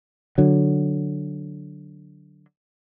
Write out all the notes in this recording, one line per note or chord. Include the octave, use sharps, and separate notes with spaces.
D3 F#3